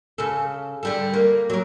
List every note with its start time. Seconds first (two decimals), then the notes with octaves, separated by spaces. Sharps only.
0.18 C#3 A4
0.83 D3 G3 A4
1.14 A#3
1.50 F#3 A#4